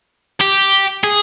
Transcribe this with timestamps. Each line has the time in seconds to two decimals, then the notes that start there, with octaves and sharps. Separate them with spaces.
0.40 G4
1.04 G#4